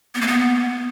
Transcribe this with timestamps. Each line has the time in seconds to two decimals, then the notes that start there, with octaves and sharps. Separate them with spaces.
0.15 B3
0.21 A#3
0.28 B3